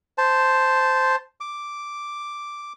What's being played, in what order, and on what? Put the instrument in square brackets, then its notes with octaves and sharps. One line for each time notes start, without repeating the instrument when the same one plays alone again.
[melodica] C5 A5
D6